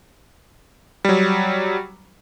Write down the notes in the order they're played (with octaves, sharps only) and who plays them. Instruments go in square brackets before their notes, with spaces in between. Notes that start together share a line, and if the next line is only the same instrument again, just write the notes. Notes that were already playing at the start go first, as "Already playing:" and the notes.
[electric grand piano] F#3 G3